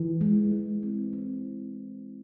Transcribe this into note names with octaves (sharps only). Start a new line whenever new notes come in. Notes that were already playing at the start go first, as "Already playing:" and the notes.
Already playing: E3
G#3
G#3
C4
C4